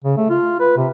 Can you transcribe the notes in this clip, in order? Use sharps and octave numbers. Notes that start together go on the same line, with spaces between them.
C#3
A3
F4
B4
C3